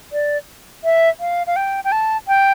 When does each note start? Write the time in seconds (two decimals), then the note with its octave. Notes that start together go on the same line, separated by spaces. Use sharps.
0.12 D5
0.84 E5
1.20 F5
1.47 F5
1.56 G5
1.84 G5
1.92 A5
2.28 G5